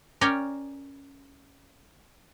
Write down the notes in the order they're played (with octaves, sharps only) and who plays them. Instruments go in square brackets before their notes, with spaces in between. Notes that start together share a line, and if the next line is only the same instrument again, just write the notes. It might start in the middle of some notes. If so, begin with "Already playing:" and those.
[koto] C#4 A#4 C#5 D5 G5